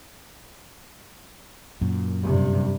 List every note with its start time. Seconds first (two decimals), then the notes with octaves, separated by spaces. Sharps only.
1.81 F#2 A#2
2.23 G2 C3